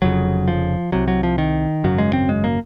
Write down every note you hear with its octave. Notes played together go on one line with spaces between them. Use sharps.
F1 F2 C#3 F#3
F3
C2 C3 F#3
F#3
F3
D#3
G#1 F#2 C#3 F#3
G#3
C4
G#3
A#3